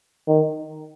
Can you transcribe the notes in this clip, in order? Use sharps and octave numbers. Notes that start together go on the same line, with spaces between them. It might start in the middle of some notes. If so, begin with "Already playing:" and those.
D#3